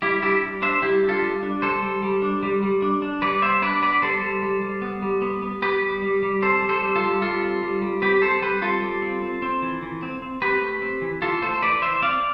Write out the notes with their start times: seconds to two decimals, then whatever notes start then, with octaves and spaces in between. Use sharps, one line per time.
0.02 G3 E4 G4
0.22 D4 E4 G4
0.43 G3
0.62 D4 C5 E5
0.82 G3 E4 G4
1.02 D4
1.09 F4 A4
1.22 G3
1.43 D4
1.62 G3 A4 C5
1.82 G3
2.02 G3
2.22 D4
2.43 G3
2.63 G3
2.82 D4
3.02 D4
3.22 G3 B4 D5
3.42 B3 C5 E5
3.62 D4 B4 D5
3.83 B3 B4 D5
4.02 G3 A4 C5
4.22 G3
4.43 G3
4.62 G3
4.82 B3
5.02 G3
5.22 B3
5.42 B3
5.62 B3 G4 B4
5.82 G3
6.02 G3
6.23 G3
6.42 C4 A4 C5
6.62 G3
6.69 A4 C5
6.82 G3
6.95 F4 A4
7.03 G3
7.22 G3 F4 A4
7.42 C4
7.62 G3
7.82 G3
8.02 C4 G4 B4
8.22 C4 A4 C5
8.42 G3 G4 B4
8.62 C4 F4 A4
8.82 G3
9.02 C4
9.22 C4
9.42 C4
9.62 E3
9.82 E3
10.03 C4
10.22 C4
10.42 C4 G4 B4
10.62 A3
10.82 C4
11.02 E3
11.22 E3 F4 A4
11.42 A3 A4 C5
11.62 E3 B4 D5
11.82 E3 C5 E5
12.02 C4 D5 F5